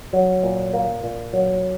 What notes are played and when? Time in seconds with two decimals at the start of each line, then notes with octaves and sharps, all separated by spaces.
0.13 F#3
0.43 A#2
0.73 A#3
1.03 A#2
1.33 F#3